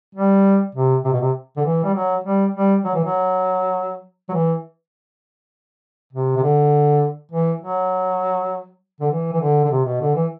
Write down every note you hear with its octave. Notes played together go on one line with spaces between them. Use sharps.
G3
C3
C3
B2
C3
D3
E3
G3
F#3
G3
G3
F#3
E3
F#3
F#3
E3
C3
C3
D3
E3
F#3
D3
E3
E3
D3
D3
C3
B2
D3
E3